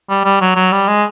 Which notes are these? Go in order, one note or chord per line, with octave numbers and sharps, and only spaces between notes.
G3
G3
F#3
F#3
G3
G#3